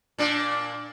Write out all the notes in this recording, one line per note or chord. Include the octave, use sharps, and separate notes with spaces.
A#2 D4